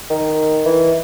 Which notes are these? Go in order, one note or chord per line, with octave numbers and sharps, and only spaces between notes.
D#3
E3